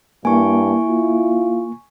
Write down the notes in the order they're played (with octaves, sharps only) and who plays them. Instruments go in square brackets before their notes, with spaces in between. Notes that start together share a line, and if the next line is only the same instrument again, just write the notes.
[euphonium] G2 [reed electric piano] A#3 [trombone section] E4 [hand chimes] G#5 C#6
[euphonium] F4